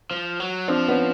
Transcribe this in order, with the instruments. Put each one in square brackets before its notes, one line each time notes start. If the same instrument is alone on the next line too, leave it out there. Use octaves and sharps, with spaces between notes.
[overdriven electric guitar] F3
F#3
[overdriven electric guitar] F3 [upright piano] C4 D4
[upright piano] B3 C#4